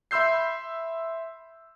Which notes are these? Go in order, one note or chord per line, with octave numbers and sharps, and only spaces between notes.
E5 B5 C6 E6 G6 C7